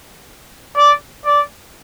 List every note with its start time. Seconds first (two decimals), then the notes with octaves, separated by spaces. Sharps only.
0.77 D5
1.25 D5